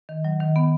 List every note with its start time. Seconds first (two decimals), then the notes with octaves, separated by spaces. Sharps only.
0.09 D#3
0.25 F#3
0.40 D#3
0.56 B3